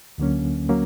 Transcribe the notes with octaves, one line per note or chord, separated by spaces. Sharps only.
D2 D3 F#3 A#3 C#4
F#3 A#3 C#4